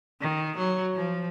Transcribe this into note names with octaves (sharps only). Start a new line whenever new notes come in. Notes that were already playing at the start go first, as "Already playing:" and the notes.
D#3
F#3
F3